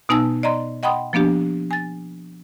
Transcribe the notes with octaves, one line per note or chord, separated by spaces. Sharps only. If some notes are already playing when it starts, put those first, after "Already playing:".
B2 B3 D#4 G#5 A5 E6
D5 D#5 A#5 C6
D#5 F#5 G5 B5 C6 D#6
F3 A#3 B3 D4 G4
G#5 A6